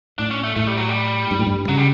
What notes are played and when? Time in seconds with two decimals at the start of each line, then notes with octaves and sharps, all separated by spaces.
0.18 A2 D4
0.31 C#4
0.44 A3
0.56 A2 A3
0.67 G3
0.77 F#3
0.89 G3
1.31 G2
1.39 A2
1.47 G2
1.68 C#3 F#3
1.78 G3